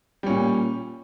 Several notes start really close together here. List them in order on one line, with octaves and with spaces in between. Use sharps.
G3 C#4 A#2